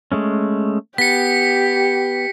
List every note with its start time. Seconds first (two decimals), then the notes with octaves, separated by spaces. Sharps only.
0.12 G#3 A3 C#4
0.98 B3 G4 B6 C#7